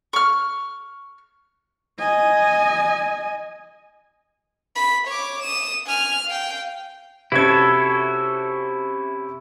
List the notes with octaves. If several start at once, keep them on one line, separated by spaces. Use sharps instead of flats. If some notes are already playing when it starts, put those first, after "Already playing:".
C#6 F6
D#5 G#5
B5
C#5 D6
D#6 E7
G#5 F6
F5 G5
C3 C#4 E4 F#4 A4 G#6